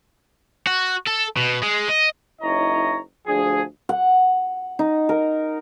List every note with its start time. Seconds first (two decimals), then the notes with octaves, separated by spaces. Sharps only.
0.67 F#4
1.07 A4
1.37 B2
1.63 G#3
1.89 D#5
2.42 F#1 D#4 E4 C#5 D#5 A#5
3.27 D2 F3 D4 G#4
3.89 F#5
4.79 D#4
5.09 A#4